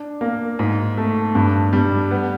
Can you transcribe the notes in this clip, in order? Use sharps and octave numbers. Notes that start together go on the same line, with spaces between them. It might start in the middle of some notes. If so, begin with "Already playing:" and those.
Already playing: D4
A#3
G#2
A3
G2
G3
B3